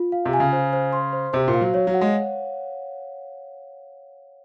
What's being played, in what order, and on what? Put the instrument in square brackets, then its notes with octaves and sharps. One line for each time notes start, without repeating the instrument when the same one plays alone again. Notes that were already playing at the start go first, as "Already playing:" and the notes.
Already playing: [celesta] F4
F5
[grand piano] C3
[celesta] G#5
[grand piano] C#3
[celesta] C5
C5
C6
C5
[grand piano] C3 [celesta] C5
[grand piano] A#2
[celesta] F5
[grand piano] F#3
[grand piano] F#3 [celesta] C#5
[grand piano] F#3
[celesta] F#5
[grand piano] G#3